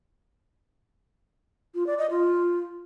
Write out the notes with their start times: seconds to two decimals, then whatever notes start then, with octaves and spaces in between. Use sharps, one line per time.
1.75 F4
1.87 D5
1.98 D#5
2.10 F4